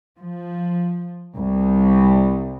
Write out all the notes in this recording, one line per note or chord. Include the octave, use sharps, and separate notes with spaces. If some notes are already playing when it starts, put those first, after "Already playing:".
F3
C2